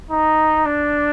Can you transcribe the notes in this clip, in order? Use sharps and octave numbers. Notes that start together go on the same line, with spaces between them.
D#4
D4